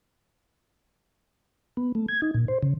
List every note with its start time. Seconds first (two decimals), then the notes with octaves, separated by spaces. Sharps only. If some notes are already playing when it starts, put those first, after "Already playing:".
1.77 B3
1.95 A3
2.08 G#6
2.22 D#4
2.34 A#2
2.48 C5
2.63 C#3